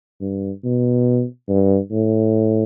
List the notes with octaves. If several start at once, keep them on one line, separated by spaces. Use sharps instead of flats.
G2
B2
G2
A2